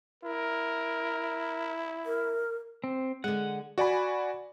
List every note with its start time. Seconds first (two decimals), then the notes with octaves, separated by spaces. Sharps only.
0.24 E4 A#4
2.06 A#4
2.84 C4
3.24 D3 G#3 F#5
3.78 F#4 D5 G#5 B5